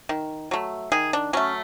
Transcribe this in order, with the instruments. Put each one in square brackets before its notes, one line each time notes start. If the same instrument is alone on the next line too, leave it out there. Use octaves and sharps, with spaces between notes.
[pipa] D#3
F#3 A3
D#3 G#4
D4
F#3 A3 C#4